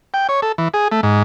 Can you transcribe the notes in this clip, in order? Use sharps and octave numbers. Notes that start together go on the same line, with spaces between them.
G5
C#5
A4
E3
G#4
A3
G#2